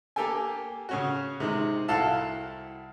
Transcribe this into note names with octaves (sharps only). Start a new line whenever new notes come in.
A#3 G4 A4 G5 G#5
C#3 C#4 F#4
C3 D#3 G#3
C2 E4 F#4 A4 F5 A5